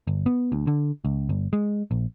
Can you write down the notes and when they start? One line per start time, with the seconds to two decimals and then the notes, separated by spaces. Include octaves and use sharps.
0.07 G1
0.26 B3
0.52 D2
0.67 D3
1.05 C#2
1.29 G1
1.53 G#3
1.91 A#1